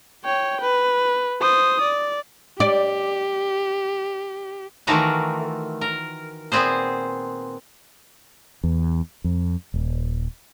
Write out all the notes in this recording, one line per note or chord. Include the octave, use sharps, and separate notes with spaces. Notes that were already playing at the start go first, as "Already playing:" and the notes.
C#5 G5
B4
C5 D#6
D5
G4 D5
D#3 E3 A3 F4 F#4 A#4
A#4
A#2 B3 C4 G#4 C5
E2
F2
D#1